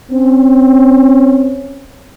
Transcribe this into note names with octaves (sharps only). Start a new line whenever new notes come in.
C4 C#4